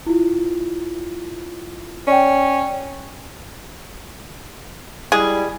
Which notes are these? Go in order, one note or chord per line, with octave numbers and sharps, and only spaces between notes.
E4 F4
C#4 D5 G5
G3 G#3 E4 G#4